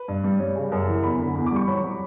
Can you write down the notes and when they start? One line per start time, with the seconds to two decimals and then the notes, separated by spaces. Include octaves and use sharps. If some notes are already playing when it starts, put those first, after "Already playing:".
Already playing: B4
0.08 G2
0.24 G3
0.39 G3 C#5
0.55 C#3
0.72 F#2
0.87 E3
1.04 E2 B5
1.19 D3
1.35 E2 B5
1.46 D6
1.52 G3 C#6
1.67 F#3 B5
1.84 F#3